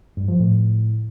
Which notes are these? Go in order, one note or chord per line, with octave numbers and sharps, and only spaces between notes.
G2
F3
A2